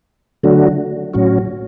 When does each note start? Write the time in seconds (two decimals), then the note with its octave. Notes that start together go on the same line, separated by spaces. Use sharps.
0.43 D3 F#3 A3 D4 F#4
1.14 A2 F#3 C#4 F#4